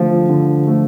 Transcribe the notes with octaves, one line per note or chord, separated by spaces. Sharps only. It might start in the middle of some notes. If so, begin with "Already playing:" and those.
Already playing: D3 F3 A3
D3
F3 A3